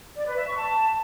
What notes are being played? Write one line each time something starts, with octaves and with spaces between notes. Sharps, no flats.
D5
B4
E5
C#6
A5